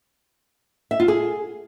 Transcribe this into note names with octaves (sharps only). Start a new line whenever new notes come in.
E5
F4
G#4